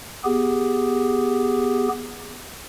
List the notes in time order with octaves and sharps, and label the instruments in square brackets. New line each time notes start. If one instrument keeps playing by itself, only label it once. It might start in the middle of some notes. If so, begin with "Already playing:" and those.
[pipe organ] B3 G4 G#4